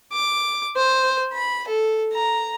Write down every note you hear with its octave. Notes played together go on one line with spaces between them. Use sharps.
D6
C5
B5
A4
A#5